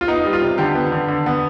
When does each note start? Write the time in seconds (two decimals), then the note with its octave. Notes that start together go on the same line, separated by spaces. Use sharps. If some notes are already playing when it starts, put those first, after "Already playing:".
0.01 F4
0.07 B3 D#4
0.25 G3
0.33 F4
0.41 C3
0.58 D3 G4
0.75 B3
0.92 D3
1.08 D3
1.26 B3